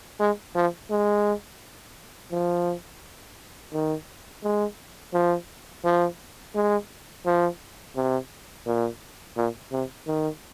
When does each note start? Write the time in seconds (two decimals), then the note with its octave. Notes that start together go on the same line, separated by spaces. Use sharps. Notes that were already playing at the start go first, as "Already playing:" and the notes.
0.20 G#3
0.55 F3
0.90 G#3
2.31 F3
3.73 D#3
4.44 G#3
5.13 F3
5.85 F3
6.55 G#3
7.26 F3
7.96 C3
8.66 A#2
9.37 A#2
9.72 C3
10.07 D#3